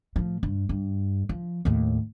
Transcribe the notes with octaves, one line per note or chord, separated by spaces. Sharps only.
A2 F3
G2
G2
F3
D#2 A2